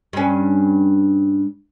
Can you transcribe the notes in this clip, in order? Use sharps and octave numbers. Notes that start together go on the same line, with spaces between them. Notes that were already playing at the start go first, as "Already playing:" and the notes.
G2 C#4